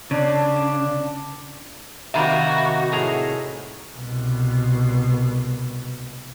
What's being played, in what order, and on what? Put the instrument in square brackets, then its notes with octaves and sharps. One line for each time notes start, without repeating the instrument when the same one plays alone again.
[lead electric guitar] C#3 [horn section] D4
[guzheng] C3 D#3 A#3 [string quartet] F#4 [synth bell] E5 A#5 B5
[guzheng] A2 G#4 A#5
[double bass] C2 B2